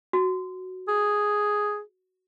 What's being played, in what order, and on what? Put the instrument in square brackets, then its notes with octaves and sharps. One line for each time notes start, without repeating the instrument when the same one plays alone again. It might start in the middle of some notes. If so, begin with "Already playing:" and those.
[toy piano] F#4
[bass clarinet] G#4